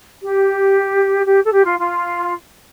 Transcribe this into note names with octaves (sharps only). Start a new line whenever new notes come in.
G4
G4
A4
G4
F4
F4